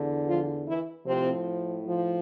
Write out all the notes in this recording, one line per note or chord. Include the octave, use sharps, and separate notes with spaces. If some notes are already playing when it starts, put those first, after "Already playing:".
Already playing: E2 D3
F3 F4
E3 E4
A2 C3 F3 C4
F3